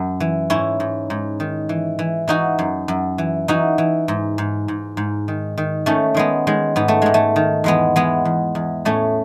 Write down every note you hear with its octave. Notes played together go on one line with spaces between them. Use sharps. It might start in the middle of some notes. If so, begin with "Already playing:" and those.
Already playing: F#2
E3
G#2 C#4 E4
G#2
G#2
D#3
E3
E3
E3 D#4 F#4
F#2
F#2
E3
E3 D#4 F#4
E3
G#2
G#2
G#2
G#2
D#3
D#3
D#3 A3 C#4
D#3 G#3 B3
D#3 G#3
G#2 B3
A3
G#2 G#3
A3
D#3
E2 G#3 B3
E3 G#3 B3
E2
E2
A2 A3 C#4